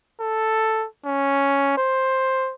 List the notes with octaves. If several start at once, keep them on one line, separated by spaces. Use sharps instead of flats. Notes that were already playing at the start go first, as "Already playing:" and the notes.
A4
C#4
C5